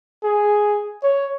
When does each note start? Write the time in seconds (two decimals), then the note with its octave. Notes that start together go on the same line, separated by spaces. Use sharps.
0.23 G#4
1.03 C#5